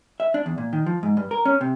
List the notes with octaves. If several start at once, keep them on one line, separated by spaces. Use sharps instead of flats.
E5
D4
E2
A#2
D#3
F3
G#2
G2
A#4
C#4
C3